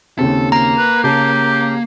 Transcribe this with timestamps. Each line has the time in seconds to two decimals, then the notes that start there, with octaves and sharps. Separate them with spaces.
0.19 D#2 C#3 C4 A4
0.52 A#3 A#5
0.78 B4
1.04 C#3 G4 A5